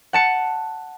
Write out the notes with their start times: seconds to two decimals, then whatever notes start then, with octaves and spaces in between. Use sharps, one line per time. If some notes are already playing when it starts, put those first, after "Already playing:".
0.13 F#5 A5 C#7